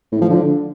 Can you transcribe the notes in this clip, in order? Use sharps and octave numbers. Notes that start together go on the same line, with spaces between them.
A2
F3
D3